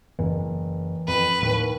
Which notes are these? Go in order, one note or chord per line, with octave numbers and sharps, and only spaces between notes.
F#1 E3
F2 B4
D#2 A2